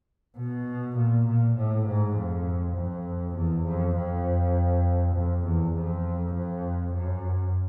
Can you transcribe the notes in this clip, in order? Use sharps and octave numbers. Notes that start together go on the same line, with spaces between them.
B2
A#2
A#2
A2
G#2
F2
F2
E2
F2
F2
F2
E2
F2
F2
F#2